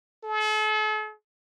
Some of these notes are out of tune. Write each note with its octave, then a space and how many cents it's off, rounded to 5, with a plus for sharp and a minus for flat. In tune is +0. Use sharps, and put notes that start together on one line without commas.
A4 -45